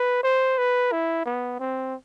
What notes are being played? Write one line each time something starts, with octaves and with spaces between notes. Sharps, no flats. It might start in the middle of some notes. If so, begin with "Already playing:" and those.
Already playing: B4
C5
B4
E4
B3
C4